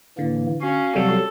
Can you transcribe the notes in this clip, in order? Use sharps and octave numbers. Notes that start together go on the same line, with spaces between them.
A2 D3 E3 A#3
C#4 F#4 F5
C3 F#3 G3 A4